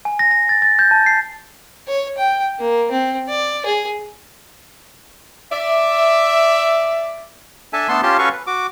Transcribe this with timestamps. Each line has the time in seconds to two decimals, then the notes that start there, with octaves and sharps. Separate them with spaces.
0.05 G#5
0.19 A#6
0.31 A#6
0.49 A6
0.62 A6
0.79 G6
0.91 A5
1.06 C7
1.88 C#5
2.18 G5
2.59 A#3
2.91 C4
3.29 D5
3.66 G#4
5.52 D5 E5
7.73 D4 A4 E5 G#5 A5
7.89 A3 B3 D4 A4 A5 C6
8.03 C#4 F4 G4 A5 C6
8.19 C#4 F#4 A4 B4 F5 C#6
8.33 B4
8.47 F#4 D6